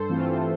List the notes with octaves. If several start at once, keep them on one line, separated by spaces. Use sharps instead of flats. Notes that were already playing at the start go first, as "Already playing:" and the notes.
Already playing: G2 A4 C5
E3 A3 C4 F4